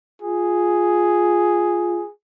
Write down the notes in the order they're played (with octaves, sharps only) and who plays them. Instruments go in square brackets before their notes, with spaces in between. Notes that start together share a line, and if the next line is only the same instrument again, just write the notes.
[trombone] F4 [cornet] G#4